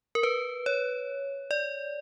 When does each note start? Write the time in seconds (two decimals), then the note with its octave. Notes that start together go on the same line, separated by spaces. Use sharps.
0.15 A#4
0.23 B4
0.66 C#5
1.51 D5